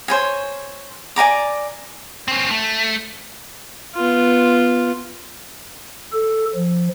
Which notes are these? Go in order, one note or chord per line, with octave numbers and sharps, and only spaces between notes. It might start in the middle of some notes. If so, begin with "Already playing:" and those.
C5 C#5 G#5
D5 G#5 A#5 D6
C4 C#4
A3
B3 F4
A4
F3